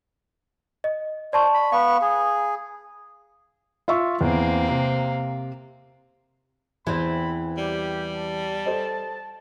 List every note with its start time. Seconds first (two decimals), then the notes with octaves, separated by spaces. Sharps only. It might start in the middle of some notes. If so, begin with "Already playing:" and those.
0.84 D#5
1.33 C5 D5 A5 C#6
1.54 B5
1.72 B3 F5 C#6
2.01 G#4
3.88 F4 E5 C#6
4.21 E2 A#3 C4
4.69 C3
6.87 E2 E3 C4 B5
7.57 G3 G4
8.15 A5
8.66 A4 C5 D#5